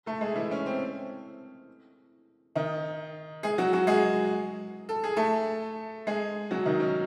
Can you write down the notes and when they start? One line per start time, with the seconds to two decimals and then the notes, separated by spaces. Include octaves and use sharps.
0.06 A3 A4
0.21 G#3 G#4
0.35 E3 E4
0.51 C#4
0.66 C4
2.56 D#3 D#4
3.43 G#3 G#4
3.58 F#3 F#4
3.73 F#3 F#4
3.87 G#3 G#4
4.89 A4
5.04 G#4
5.16 A3 A4
6.07 G#3 G#4
6.51 F#3 F#4
6.66 D#3 D#4
6.80 C#4